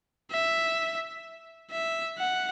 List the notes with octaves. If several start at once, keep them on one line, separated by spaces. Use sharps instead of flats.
E5
E5
F#5